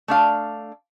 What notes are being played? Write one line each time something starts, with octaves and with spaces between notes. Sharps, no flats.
A3 D4 F5